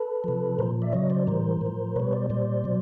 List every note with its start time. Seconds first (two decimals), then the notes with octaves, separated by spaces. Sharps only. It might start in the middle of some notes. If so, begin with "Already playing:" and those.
Already playing: A4 B4
0.24 C3 F3
0.59 A#2 F3 A#4 C5
0.82 D5 E5
0.93 C#3 F#3 C#5 D#5
1.10 C5 D5
1.27 A2 E3 G3 A#4 C5
1.61 A2 F3
1.96 B2 G3 B4 C#5
2.13 C5 D5
2.30 A#2 G3 C5 D5
2.64 B2 F#3